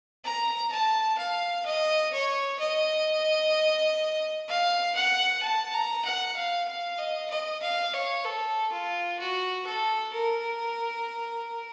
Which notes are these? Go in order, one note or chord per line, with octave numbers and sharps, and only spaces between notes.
A#5
A5
F5
D#5
C#5
D#5
F5
F#5
A5
A#5
F#5
F5
F5
D#5
D#5
F5
C#5
A4
F4
F#4
A4
A#4